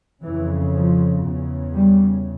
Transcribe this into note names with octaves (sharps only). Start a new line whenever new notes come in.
F2 C#3 E3
F3
E2 C#3
G3